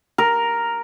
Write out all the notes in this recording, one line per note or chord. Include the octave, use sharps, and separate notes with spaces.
A#4